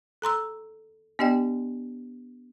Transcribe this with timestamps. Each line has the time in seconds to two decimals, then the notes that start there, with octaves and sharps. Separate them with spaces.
0.22 A4 A#5 C6 E6
1.19 B3 D4 G4 D5 D#5 G5